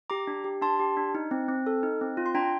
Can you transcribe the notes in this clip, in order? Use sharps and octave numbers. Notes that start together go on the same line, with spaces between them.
G4 A#5 D6
D4
G4
D4 A5 C6
G4
D4
D#4
C4
C4
A4
D#4
C4
F4
C6
D4 G5 A#5